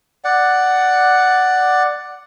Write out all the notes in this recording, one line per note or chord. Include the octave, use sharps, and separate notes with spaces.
D5 F#5